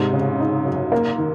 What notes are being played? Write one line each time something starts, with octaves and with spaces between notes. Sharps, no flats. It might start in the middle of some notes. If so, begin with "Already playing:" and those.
Already playing: G#2 C3 D#4
C#3
D#4
F#2
A#3
D#3